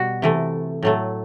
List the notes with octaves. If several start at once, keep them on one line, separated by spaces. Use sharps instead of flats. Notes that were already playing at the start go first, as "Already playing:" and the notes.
Already playing: B2 G3 F#4
C3 E3 A3
A2 F#3 A3